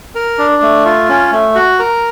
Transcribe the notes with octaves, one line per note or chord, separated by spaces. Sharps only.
A#4
D4
A3
F4
C#4
A3
F#4
A#4